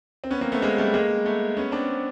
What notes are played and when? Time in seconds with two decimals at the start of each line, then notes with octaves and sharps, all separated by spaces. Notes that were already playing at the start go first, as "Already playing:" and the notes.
0.24 C4
0.30 B3 C#4
0.41 A#3 C4
0.52 A3 B3
0.62 G#3 A#3
0.78 G3 A3
0.94 G#3 A#3
1.25 A3 B3
1.57 B3 C#4
1.72 C4 D4